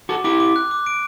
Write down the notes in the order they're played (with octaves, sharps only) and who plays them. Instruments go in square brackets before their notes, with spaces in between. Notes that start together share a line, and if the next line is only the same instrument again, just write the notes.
[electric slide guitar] F#4 A4 [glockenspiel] D6
[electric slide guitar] E4 G4 [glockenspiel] D6
[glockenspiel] D6
F#6
D6
D7